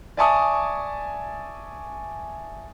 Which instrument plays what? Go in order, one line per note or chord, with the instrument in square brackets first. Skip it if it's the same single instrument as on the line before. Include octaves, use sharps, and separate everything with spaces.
[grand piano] D5 E5 G#5 A5 C#6 D#6